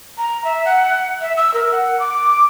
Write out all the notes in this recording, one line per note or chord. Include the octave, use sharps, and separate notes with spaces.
A#5
E5
F#5
E5
E6
A#4
F#5
D6